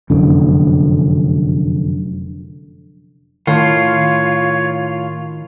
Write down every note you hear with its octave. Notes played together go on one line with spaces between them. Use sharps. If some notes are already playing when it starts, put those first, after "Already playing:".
F1 F#2 D3
A2 D#3 F4 C#5